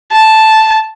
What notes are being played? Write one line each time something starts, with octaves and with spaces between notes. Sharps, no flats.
A5